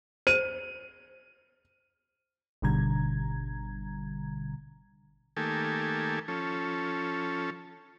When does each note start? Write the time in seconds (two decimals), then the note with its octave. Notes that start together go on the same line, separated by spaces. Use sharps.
0.27 C5 D#7
2.62 G#1 B2 D3 G3 A#5 G#6
5.37 D#3 A3 A#3 G4 A4 G#5
6.28 F3 C#4 A4